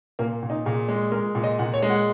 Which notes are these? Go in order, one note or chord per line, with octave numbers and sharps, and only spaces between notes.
A#2 A#3
A#2
D#4
A#2 G#4
G#3
G#3 A#4
A#2
D#5
A#2 F#5
C#5
G#3
F#5